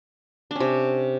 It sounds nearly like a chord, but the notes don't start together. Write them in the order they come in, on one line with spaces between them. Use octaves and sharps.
D4 C#4 C3